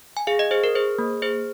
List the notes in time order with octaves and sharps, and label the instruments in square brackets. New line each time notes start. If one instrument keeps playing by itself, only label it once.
[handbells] G#5
G#4 F5
D#5
G#4 C5
A#4
G#4 C5
A#3
G#4 C5